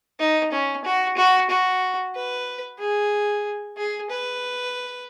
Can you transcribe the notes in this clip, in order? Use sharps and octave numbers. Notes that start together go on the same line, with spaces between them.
D#4
C#4
F#4
F#4
F#4
B4
G#4
G#4
B4